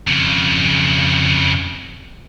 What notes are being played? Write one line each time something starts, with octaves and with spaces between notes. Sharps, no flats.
F2 C#3